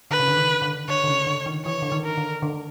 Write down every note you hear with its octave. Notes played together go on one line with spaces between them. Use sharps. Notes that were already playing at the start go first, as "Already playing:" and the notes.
D3 B4
C#3
D3
D#3
D3
D3 C#5
D3
C#3
D3
D#3
E3 C#5
D3
D#3
A#4
D3
D3